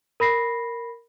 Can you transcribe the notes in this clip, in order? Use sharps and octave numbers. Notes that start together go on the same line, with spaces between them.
A#4 B5 A#6 C7